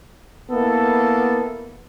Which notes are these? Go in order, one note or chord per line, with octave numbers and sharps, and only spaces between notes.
A#3 B3 E4 A4